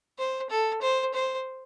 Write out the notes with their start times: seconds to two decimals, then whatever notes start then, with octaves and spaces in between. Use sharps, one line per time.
0.18 C5
0.50 A4
0.82 C5
1.14 C5